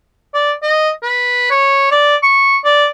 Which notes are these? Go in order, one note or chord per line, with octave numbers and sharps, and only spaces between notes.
D5
D#5
B4
C#5
D5
C#6
D5